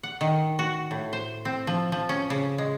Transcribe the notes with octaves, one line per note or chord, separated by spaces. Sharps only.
F#5
D#3
F#4
A2
C5
C4
F3
F3
C#4
C#3
G#3